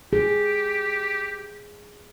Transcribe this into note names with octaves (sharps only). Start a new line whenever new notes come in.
G4 G#4